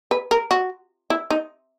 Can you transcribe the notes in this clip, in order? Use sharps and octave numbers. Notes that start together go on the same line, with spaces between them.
B4
A#4
F#4
E4
D#4